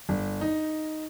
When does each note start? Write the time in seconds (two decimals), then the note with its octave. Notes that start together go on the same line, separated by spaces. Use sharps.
0.09 G1
0.41 D#4